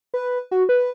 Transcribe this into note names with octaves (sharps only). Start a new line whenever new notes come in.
B4
F#4
B4